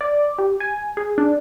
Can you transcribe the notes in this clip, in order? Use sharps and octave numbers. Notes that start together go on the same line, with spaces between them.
D5
G4
G#5
G#4
D4